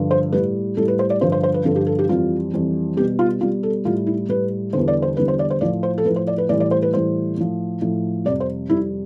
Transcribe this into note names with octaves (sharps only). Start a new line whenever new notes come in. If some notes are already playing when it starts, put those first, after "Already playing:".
Already playing: G2 D3 F3
C5
A2 G3 B4
A2 G3 A4
B4
C5
D5
G2 D3 F3 C5
C5
C5
B4
G2 D3 F3 A4
G4
A4
G4
F2 E3 G3 F4
F2 E3 G3
B2 G3 G4
F4
B2 G3 F4
A4
A2 G3 F4
E4
A2 G3 B4
E2 D3 G3 C5
D5
C5
E2 D3 G3 B4
C5
D5
C5
A2 F3 D5
C5
A4
A2 F3 B4
C5
D5
B4
A2 E3 G3 D5
D5
C5
B4
A2 E3 G3 C5
A2 F3
A2 F3
F2 C3 G3 D5
C5
F2 C3 G3 E4